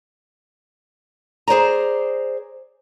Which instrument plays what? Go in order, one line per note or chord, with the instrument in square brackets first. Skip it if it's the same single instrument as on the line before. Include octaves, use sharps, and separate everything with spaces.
[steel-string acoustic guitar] G#4 C5 D5 A#5